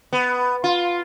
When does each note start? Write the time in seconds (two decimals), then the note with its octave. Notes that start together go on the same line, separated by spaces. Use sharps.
0.13 B3
0.64 F4